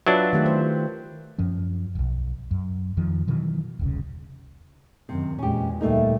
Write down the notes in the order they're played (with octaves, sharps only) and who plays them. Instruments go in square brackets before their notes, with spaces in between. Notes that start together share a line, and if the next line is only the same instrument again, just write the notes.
[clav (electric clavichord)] F#3 D4 [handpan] F4 B4 E5
[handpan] D#3 A3 G4
A3 C5
[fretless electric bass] F#2 F3 C#4
D#1 B1
F#2
F2 D#3 F3
B2 D#3 E3 F#3
E1 C2 C#3
[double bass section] F#2 D#3 [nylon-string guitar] C3
[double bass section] E2 A#2 G#3 [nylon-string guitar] C#4 G4
[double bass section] D2 A#2 G3 [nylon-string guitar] A3 A#3 D#4